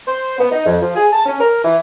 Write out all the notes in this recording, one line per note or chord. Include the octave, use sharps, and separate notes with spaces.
C5
B3
D#4
F2
F3
G#4
A5
C#4
A#4
E3